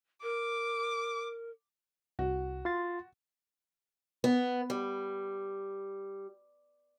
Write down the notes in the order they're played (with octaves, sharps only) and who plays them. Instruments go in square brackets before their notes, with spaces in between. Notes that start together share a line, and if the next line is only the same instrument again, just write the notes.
[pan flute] A#4 [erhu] D6
[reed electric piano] C2 [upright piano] F#4
[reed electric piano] F4 C6 A6
[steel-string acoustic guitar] B3
G3